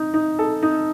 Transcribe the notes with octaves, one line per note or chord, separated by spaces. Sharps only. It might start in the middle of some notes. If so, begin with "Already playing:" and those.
Already playing: D#4
D#4
A4
D#4